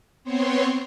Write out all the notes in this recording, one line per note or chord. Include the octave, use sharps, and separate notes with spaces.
B3 C4 C5 C#5